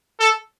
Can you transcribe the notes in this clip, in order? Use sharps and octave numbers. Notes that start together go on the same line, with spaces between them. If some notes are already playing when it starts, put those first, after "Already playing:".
A4